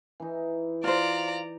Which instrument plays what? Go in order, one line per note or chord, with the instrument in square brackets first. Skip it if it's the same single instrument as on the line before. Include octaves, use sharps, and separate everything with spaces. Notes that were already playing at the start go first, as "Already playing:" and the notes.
[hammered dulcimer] E3 D#4
[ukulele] F4 C5 [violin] D5 A#5